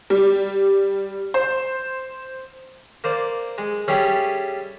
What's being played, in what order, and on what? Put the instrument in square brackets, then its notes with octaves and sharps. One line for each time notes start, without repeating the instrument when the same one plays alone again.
[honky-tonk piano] G3
C5
[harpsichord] A#3 C5 D5
G#3
G3 C#4 E4 G#4 A4